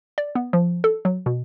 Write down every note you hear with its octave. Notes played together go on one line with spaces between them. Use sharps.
D5
B3
F3
A4
F#3
B2